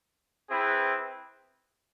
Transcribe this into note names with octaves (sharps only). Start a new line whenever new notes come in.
C4 E4 G#4 B4